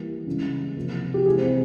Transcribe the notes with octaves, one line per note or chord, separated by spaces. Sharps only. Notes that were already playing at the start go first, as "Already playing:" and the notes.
Already playing: E3 G3 A#3
C#3 E3 G#3
C3 F3 A#3
G4
C3 E3 G#3 G#4
C4